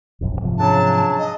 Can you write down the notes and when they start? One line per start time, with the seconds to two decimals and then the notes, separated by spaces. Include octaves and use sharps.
0.21 E1 A#1 F#2
0.42 G#2 C3 F3
0.58 C#3 F#3 D4 A5
1.19 D#5